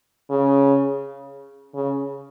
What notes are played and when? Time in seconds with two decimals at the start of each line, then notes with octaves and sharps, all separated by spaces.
0.30 C#3
1.75 C#3